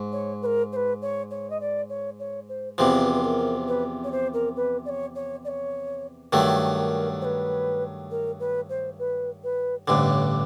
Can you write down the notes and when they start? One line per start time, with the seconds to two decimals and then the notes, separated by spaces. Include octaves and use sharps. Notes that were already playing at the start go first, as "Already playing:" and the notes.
Already playing: G#2
0.12 C#5
0.42 B4
0.46 A#4
0.72 C5
0.76 B4
1.02 C#5
1.30 C#5
1.50 D#5
1.61 D5
1.89 C#5
2.19 C#5
2.49 C5
2.78 E2 C3 F3 B4
3.15 B4
3.23 A#4
3.68 B4
4.04 C#5
4.12 C5
4.33 A#4
4.56 B4
4.85 D5
4.89 C#5
5.15 C#5
5.44 D5
5.48 C#5
6.33 G2 D#3 F#3 A3
6.77 A#4
7.21 C5
7.25 B4
8.11 A#4
8.40 B4
8.69 C5
8.99 B4
9.43 B4
9.87 A1 G2 D3 C5
10.09 C#5